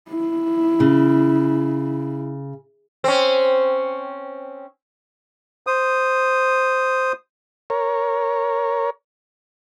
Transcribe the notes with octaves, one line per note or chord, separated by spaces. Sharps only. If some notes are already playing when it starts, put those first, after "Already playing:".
E4
C#3
C4 C#4
C5 D#6
A#4 C#5